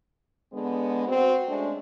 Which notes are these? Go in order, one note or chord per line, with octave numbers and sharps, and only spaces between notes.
D3 G#3 B3
C4 F#4
G#3 A3 C#4 D4